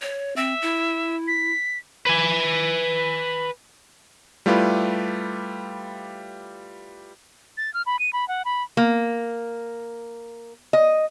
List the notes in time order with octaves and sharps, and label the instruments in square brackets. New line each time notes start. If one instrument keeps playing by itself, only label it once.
[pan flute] C#5
[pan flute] C4 [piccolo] E5
[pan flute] E4
[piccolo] B6
[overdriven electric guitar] B4 G#5
[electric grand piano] G3 A3 E4 F4 G4 B4
[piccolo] A6
F6
B5
D#7
B5
F#5
B5
[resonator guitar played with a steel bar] A#3
D#5